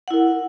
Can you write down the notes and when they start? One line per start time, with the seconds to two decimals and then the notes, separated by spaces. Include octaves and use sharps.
0.08 F#5
0.10 E4
0.13 A#4